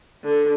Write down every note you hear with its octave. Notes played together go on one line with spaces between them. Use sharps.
D3